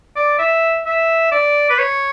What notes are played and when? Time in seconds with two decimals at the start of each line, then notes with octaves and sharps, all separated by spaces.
0.16 D5
0.39 E5
0.86 E5
1.31 D5
1.69 B4
1.79 C#5